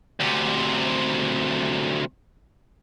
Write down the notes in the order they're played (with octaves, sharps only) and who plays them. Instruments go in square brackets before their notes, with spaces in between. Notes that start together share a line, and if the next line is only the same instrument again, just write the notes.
[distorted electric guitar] D2 C3